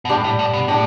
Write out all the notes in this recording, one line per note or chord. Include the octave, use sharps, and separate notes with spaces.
B2
A2 G3 D4 G4
A2
A2
B2
A2 D4 G4